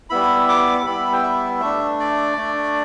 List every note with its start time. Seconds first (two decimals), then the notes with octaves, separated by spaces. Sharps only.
0.10 G3 B3 E4 B5
0.49 D6
0.78 D6
0.86 G3 B3 E4 B5
1.13 G5
1.23 E5
1.61 A3 D4 E5
2.00 D5
2.37 A3 D4